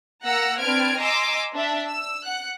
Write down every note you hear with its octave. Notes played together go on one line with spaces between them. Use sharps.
A#3 F#5 A#5 E6 A#6
C4 D4 B4 F6 G#6 D7
D#5 G#5 A#5 C6 D6 E6
D4 E5
E6
F#5 F#6